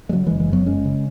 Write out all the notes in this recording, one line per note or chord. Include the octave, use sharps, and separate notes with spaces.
G#3
C#3 F#3
E3 G#3
F#1
E3 G#3
F#2 F#3 B3
F#1 G#3 C#4
C#3